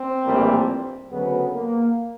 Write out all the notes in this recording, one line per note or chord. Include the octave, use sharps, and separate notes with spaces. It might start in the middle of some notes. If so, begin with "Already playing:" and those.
Already playing: C4
A#1 A2 E3 G3 A#3
D2 C#3 F#3 B3
A#3